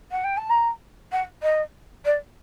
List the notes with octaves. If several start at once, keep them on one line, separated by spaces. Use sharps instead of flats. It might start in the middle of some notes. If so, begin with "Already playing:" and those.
F#5
G5
A5
A#5
F#5
D#5
D5